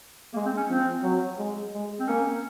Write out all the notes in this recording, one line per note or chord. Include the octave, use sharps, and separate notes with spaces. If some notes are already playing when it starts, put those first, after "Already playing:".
G#3 A#3
C4
C#4
F3 C4
F#3
G#3
G#3
C4
A#3 C#4